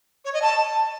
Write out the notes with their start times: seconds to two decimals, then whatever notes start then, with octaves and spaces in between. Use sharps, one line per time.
0.25 C#5
0.33 D#5
0.42 A5